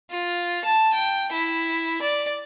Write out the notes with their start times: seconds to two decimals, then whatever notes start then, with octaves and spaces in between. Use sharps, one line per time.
0.11 F4
0.65 A5
0.94 G5
1.33 E4
2.02 D5